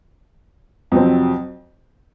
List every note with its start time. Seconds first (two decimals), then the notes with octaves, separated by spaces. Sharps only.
0.92 F2 C3 F#3 C4